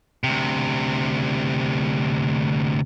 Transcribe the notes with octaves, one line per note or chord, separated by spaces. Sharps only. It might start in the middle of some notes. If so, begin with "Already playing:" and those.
D2 C3